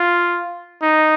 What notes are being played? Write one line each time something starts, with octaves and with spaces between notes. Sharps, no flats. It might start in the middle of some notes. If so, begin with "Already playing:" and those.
Already playing: F4
D#4